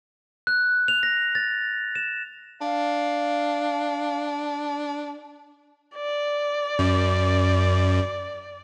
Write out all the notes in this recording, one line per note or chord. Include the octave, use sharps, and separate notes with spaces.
F#6
F7
A#6
A6
E7
D4 F5
D5
F#2